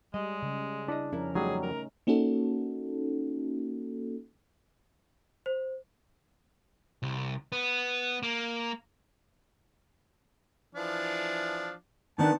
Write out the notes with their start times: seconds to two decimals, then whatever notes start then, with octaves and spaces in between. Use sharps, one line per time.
0.14 G3 G#3 D#5
0.42 C#3
0.88 D4 E4 C#5 D#5
1.13 F2 C#4 E4 A#4
1.35 F#3 G3 A3 C#4 D#4 G#4
1.63 A#4
2.07 A#3 C#4 D#4 F#4 A4
5.46 C5
7.03 C2
7.52 B3
8.23 A#3
10.75 E3 F3 D4
12.19 D#3 B3 D4 A5